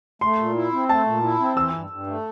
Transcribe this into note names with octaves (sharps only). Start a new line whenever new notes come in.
A3 C6
A#2
E4
C4
A3 A5
A#2
E4
C4
E3 E6
G2
G2
A3